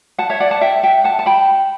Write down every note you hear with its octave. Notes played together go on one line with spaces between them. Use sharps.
F#5 A5
C#5 E5
D5 F#5
F#5 A5
E5 G5
E5 G5
F#5 A5
A5
G5 B5